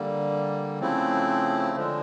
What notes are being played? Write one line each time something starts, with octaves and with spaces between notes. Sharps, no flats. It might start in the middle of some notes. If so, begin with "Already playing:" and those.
Already playing: D3 G3 A#3
C#3 F3 A3 C4 E4
D3 F3 G#3